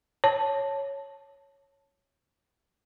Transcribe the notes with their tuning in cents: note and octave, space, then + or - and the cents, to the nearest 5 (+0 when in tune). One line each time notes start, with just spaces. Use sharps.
C#5 +0 A5 +0